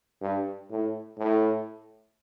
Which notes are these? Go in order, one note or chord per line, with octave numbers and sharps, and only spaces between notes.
G2
A2
A2